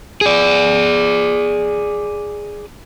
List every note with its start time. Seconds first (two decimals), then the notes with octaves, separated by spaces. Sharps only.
0.21 G#4 D5